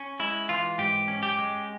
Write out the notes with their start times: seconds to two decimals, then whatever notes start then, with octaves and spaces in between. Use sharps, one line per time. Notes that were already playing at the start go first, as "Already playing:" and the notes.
Already playing: C#4
0.20 G#3 E4
0.49 E3 F4
0.78 G#2 G4
1.08 C#4
1.23 G4
1.39 G#3